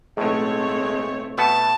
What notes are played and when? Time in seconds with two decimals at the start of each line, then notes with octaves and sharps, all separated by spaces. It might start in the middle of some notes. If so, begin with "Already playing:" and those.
0.17 B1 A2 G#3 A3 C4 C#5
1.38 B2 A3 B3 A5